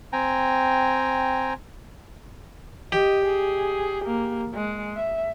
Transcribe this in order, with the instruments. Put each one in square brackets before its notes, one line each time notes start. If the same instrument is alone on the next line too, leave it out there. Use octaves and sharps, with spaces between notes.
[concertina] C4 G5 G#5 A#5
[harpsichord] G4 [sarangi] D#5
[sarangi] G#4
A#3
G#3
E5